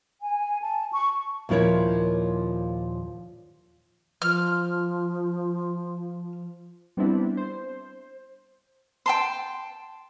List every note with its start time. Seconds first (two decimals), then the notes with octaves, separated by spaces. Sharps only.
0.20 G#5
0.61 A5
0.92 C#6
1.49 D#2 A#2 F3 E4 A#4 C#5
4.22 F3 F6
6.97 G3 B3 C4 D4 E4
7.37 C5
9.06 G5 A5 C6